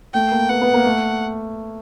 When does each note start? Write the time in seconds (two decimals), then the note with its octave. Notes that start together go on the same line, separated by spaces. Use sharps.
0.14 A3 G5
0.32 A#3
0.49 B3 F#5
0.62 B3
0.74 A#3
0.85 A3